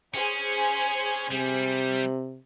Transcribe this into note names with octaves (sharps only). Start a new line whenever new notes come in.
C#4 G#4 C5 G#5
C3 G3